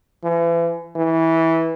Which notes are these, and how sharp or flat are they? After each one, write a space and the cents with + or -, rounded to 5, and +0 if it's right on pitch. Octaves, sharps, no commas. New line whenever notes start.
E3 +40
E3 -15